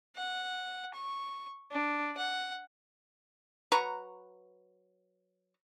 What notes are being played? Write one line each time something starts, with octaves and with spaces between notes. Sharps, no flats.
F#5
C#6
D4
F#5
F#3 B4 A#5 C#6